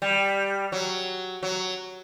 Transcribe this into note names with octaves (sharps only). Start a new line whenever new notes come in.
G3
F#3
F#3